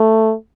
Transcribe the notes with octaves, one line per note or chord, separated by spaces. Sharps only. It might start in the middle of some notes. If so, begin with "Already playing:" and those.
Already playing: A3